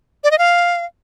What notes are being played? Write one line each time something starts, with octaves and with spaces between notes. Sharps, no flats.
D5
D#5
F5